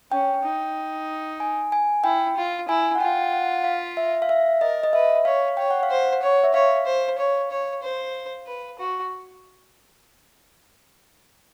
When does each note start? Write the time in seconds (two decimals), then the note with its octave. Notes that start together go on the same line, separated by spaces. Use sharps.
0.11 C#4 G5
0.43 D#4
1.40 G#5
1.72 G#5
2.04 E4 G5
2.37 F4
2.69 E4 G#5
2.95 F#5
3.01 F4 G5
3.33 F#5
3.64 F5
3.97 E5
4.22 F5
4.29 E5
4.61 A#4 D#5
4.83 D#5
4.93 B4 E5
5.25 C#5 F5
5.57 C#5 G5
5.71 F#5
5.83 F5
5.90 C5 F#5
6.22 C#5
6.44 E5
6.54 C#5 F5
6.86 C5
7.18 C#5
7.51 C#5
7.82 C5
8.47 B4
8.79 F#4